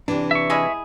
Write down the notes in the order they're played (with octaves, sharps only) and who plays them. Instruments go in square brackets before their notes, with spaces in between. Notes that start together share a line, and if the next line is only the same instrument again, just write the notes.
[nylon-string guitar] C3 E3 [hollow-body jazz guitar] D4
[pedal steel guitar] E5 C#6
[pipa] G#3 E4 G#4